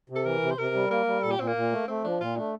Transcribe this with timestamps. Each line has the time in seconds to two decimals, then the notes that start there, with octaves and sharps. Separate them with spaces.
0.10 C3
0.15 A4
0.25 E3 A#4
0.42 C3
0.51 C5
0.58 C3 A#4
0.75 G3
0.91 A#3 A#4
1.07 G3
1.23 A#2 A4
1.31 G4
1.39 A#2 C4
1.48 A#3
1.56 A#2
1.72 A3
1.88 A3 C4
2.04 F3 D4
2.21 A#2 F4
2.36 A3 D4